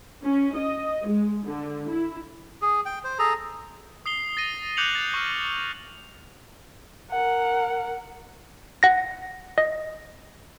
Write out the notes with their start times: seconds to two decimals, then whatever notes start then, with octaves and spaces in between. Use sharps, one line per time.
0.23 C#4
0.56 D#5
1.06 G#3
1.45 D3
1.87 E4
2.62 G#4
2.86 G5
3.04 C5
3.19 G#4 A4 A#5
4.06 D#6 C7 G7
4.37 A6 A#6 D#7
4.77 D6 F#6 G6 C#7 F7 F#7
4.95 A6
5.14 C#6 F6
7.11 A#4 F#5
8.83 F#5 A#6
9.58 D#5